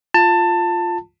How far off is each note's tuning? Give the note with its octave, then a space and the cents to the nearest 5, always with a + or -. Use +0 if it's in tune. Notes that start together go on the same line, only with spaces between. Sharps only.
F4 +0 A5 +20